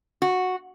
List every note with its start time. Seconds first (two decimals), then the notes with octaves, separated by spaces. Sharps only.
0.22 F#4